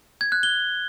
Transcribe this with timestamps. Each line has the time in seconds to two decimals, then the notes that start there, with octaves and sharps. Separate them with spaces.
0.21 G#6
0.32 F#6
0.43 G7